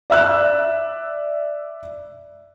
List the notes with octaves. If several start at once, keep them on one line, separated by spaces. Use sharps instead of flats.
D5 E5 E6 F#6